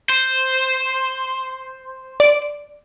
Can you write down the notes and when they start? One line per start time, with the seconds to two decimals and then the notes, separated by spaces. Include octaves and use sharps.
0.10 C5
2.20 D5 D7